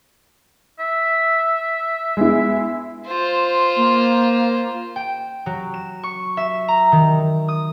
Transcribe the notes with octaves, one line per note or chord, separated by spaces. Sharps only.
E5
G#3 B3 E4
F4 C5
A#3
G5
F#3
E7
C#6
E5
A#5
D#3
D#6